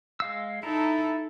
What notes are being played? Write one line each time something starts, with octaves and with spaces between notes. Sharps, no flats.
G#3 F5 E6
D#4 E4 A4 A#5